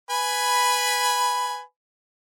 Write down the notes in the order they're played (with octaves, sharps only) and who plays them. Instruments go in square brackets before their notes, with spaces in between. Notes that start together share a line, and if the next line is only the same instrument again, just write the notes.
[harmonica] B4 G#5 B5